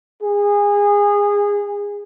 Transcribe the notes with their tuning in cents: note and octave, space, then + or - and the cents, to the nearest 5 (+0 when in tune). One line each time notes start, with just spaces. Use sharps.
G#4 -25